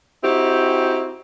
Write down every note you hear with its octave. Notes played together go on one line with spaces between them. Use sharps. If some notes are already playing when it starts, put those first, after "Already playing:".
C4 D#4 E4 F#4 G4